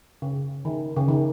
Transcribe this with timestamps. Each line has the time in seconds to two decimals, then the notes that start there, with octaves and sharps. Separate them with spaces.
0.22 C#3
0.65 D#3
0.96 C#3
1.08 D#3